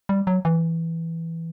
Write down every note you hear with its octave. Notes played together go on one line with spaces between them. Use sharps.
G3
F#3
E3